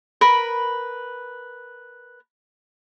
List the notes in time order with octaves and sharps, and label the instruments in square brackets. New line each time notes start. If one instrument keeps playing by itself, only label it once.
[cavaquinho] A#4 B4 B5